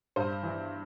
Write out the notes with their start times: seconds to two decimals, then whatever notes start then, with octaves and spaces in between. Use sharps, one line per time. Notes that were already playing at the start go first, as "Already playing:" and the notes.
0.16 G2 C5
0.43 E3